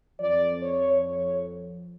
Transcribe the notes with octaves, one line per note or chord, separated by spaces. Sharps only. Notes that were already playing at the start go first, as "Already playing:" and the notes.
F2 F3 D5
C#5
C#5